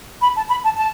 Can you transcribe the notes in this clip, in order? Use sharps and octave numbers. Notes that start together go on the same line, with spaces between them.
B5
A5
B5
A5
A5